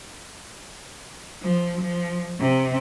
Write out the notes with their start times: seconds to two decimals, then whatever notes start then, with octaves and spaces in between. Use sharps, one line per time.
1.43 F3
1.81 F3
2.41 C3